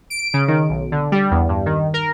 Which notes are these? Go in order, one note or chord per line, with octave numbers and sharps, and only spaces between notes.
D7
C#3
D#3
B1
D3
G3
E2
G2
D#3
A#4